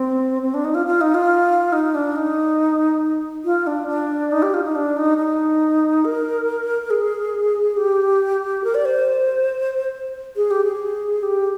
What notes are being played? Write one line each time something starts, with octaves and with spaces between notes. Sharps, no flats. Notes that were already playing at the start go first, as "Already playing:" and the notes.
Already playing: C4
C4
D4
D#4
F4
F4
D#4
F4
D#4
D4
D#4
F4
D4
D4
D#4
G4
F4
D#4
D4
D#4
D#4
A#4
G#4
G4
A#4
D5
C5
G#4
G4
G#4
G4